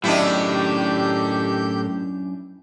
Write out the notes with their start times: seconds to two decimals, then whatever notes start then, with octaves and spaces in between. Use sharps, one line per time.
0.04 F#2 A2 D#3 D4 E4 G4 D#5 G6